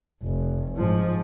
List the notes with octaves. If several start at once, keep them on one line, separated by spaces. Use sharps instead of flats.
F1
G#2 F3